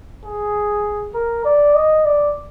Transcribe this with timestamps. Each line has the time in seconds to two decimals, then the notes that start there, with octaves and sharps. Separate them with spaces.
0.24 G#4
1.14 A#4
1.45 D5
1.75 D#5
2.05 D5